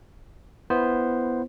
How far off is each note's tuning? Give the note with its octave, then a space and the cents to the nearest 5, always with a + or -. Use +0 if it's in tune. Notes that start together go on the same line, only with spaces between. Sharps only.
B3 +0 E4 +10 C5 +0